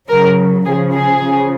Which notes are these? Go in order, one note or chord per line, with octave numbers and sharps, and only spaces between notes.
C#3 F#3 A#4
C#3 F3 G#4
G#4
C#3 F3